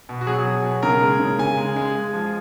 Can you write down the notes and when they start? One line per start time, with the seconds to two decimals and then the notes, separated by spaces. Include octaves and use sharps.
0.09 B2
0.21 F#4
0.27 F#3 G#4
0.45 F#3
0.64 B2
0.83 C#3 A#4
1.01 G#3
1.20 C#3
1.39 C#3 G#5
1.57 G#3
1.76 G#3
1.95 G#3
2.13 F3